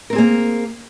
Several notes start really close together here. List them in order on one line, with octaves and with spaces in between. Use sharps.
A#4 C4 G#4 A#3